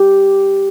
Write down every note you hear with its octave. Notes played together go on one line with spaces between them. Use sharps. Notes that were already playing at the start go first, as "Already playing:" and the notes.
Already playing: G4